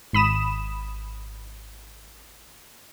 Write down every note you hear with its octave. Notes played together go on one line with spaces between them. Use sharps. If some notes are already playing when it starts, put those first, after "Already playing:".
G#1 B5 D#6 E7